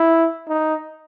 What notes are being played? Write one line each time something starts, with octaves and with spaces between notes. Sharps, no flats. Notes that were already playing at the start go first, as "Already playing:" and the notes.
Already playing: E4
D#4